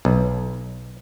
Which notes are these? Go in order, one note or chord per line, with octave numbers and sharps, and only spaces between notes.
B1